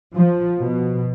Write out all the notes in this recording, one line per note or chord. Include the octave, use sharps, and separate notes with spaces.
F3
B2